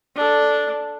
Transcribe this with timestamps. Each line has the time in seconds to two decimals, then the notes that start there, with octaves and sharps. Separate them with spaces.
0.16 D4 A4